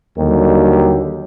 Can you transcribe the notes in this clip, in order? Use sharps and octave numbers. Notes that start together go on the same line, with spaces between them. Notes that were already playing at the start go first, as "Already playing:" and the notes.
D#2 D3 F#3 G3 G4